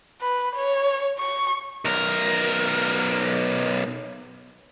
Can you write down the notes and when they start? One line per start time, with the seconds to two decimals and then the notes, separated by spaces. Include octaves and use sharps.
0.21 B4
0.56 C#5
1.19 C#6
1.85 B1 A#4